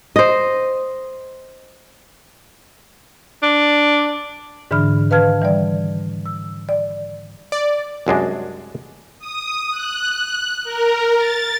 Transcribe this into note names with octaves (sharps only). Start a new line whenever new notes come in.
C5 D#5
D4
G#2 D3 E3 D4 B5 F6
D#3 B4 F5 A5 F6 G#6
E3 G3 D5
E6
D5
D5
C2 F#2 G#3 D4
D#6
F#6
A#4
A6